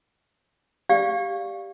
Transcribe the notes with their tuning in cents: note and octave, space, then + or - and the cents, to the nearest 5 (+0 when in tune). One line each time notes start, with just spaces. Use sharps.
G4 +0 D5 +0 F5 +0